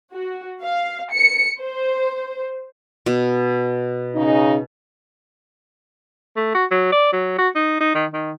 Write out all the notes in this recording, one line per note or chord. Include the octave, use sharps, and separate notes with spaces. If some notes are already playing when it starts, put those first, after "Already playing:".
F#4
F5
C#7
C5
B2
C#3 D#4
A3
F#4
F#3
D5
F#3
F#4
D#4
D#4
D#3
D#3